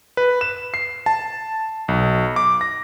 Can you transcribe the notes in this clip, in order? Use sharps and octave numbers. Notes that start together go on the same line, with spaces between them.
B4
E7
C7
A5
B1
D6
A#6